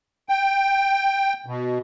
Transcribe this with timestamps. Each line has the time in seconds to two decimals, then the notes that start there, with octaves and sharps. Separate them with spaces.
0.29 G5
1.46 B2